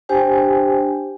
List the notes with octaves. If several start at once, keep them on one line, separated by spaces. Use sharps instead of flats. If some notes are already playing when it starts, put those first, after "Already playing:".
D4 G4 C5 G5 G#5